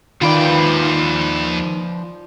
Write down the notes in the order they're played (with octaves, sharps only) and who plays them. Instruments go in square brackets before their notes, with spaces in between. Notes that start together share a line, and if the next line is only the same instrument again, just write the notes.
[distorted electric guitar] D#2 G5 [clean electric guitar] D#3 [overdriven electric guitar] F3 B4 [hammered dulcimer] F4 D5